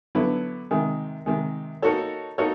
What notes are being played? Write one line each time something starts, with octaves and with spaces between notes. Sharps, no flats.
D3 F#3 B3 E4
C3 D#3 G#3
C3 D#3 G#3
A#3 D#4 F#4 A4 C#5
A#3 D#4 F#4 A4 C#5